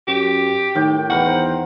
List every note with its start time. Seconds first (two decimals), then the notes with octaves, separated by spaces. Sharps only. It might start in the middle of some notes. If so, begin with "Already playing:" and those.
0.08 F#2 G4
0.75 A2 D#3 G5 D6
1.10 E2 D#3 A#4 B4 F#5
1.26 C5 A#5